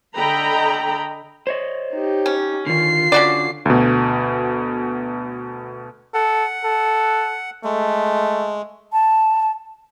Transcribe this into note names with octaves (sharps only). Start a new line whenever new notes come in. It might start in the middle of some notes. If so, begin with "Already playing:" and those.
D3 A4 D#5 G5 A#5 B5
C5 C#5 D#5
D#4 G4
C#4
D3 D#3 F4 C7
D3 C#4 F#4 D5
D2 B2
A4 F#5
A4
G#3 A3
A5